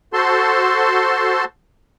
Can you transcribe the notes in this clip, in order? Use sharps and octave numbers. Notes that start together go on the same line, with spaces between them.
F#4 A4 C5 A5 C6